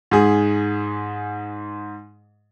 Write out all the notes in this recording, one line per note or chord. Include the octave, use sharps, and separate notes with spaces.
G#2 G#4